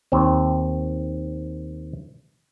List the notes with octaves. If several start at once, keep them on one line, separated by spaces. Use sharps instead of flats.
D#2 C4